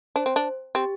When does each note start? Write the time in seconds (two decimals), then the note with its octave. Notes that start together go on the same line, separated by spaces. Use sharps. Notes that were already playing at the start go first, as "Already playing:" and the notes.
0.16 D4 C5
0.26 C4
0.36 D4
0.75 C4 G4